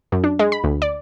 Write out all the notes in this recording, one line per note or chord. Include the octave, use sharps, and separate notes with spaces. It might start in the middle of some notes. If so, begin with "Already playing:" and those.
F#2
D4
G#3
B5
D2
D5